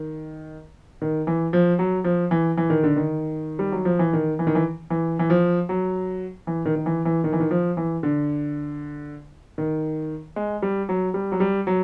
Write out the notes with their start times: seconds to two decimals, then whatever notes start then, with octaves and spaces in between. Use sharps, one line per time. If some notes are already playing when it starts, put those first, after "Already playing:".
Already playing: D#3
1.02 D#3
1.27 E3
1.53 F3
1.79 F#3
2.04 F3
2.31 E3
2.58 E3
2.70 D#3
2.84 D3
2.96 D#3
3.59 G3
3.72 F#3
3.85 F3
3.99 E3
4.13 D#3
4.39 E3
4.47 D#3
4.55 E3
4.90 E3
5.19 E3
5.30 F3
5.69 F#3
6.47 E3
6.66 D#3
6.76 D#3
6.86 E3
7.05 E3
7.24 D#3
7.33 E3
7.40 D#3
7.51 F3
7.77 E3
8.03 D3
9.58 D#3
10.36 G#3
10.62 G3
10.89 F#3
11.14 G3
11.32 F#3
11.40 G3
11.67 F#3